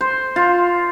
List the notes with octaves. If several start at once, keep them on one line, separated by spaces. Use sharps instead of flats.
C5
F4